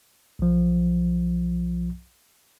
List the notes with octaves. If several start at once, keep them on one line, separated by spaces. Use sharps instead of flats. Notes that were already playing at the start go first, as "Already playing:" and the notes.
B1 F3